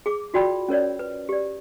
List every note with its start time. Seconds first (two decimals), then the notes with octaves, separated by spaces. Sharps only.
0.06 G#4 D6
0.34 F4 F#4 D5 G5 B5
0.69 C#4 A#4 C#5 D5
0.99 B4
1.29 G4 D5